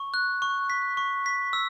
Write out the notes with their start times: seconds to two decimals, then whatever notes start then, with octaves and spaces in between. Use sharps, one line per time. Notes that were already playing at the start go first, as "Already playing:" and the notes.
Already playing: C#6
0.14 F#6
0.42 C#6
0.70 B6
0.97 C#6
1.26 B6
1.53 E6